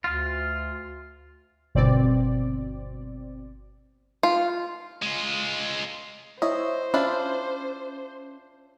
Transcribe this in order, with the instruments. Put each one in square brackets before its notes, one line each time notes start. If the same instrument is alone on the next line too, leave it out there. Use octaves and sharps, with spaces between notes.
[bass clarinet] D2 [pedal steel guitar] F4
[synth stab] G1 B2 C4 D5
[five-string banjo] F4
[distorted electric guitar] G#3 F4
[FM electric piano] E4 C#5 E5 [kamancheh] C5 [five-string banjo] D#5
[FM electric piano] C#4 [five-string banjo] D4 E4 F4